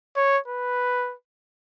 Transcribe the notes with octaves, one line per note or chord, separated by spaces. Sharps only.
C#5
B4